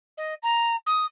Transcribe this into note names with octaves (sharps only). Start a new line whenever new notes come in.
D#5
A#5
D#6